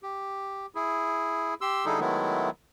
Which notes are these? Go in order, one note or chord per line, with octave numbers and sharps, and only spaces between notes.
G4
E4 G#4
G4 C6 E6
D3 G3 D#4 E4 G#4 A4
D#3 F#3 G#3 A3 B3 E4